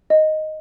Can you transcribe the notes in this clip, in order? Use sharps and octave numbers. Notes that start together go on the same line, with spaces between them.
D#5